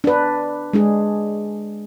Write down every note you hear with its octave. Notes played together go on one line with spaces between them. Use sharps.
D4 B4
G#3 D4 G#4